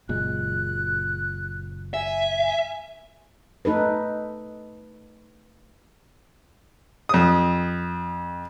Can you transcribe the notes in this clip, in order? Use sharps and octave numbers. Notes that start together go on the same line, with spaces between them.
F#1 A#2 G#3 F#6
E5 G#5
A3 D#4 A4 B4
F2 D#6